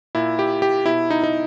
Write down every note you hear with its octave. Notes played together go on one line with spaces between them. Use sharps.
A#2 E4
G4
G4
B2 E4
D#4
D#4